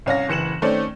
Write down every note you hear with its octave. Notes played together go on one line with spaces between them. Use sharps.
C2 C#4 F5 A#6
F#1 E3 C#7 E7 F#7
D#3 A3 C4 C#4 D5